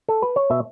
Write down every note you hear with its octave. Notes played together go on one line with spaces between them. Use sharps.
A4
B4
C#5
B2 E5